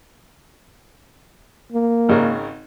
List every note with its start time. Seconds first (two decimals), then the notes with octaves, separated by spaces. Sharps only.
1.72 A#3
2.09 G#1 C#3 A#4